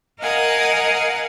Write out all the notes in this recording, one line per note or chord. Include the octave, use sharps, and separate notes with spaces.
A#4 D#5 F5 F#5 G#5 D#6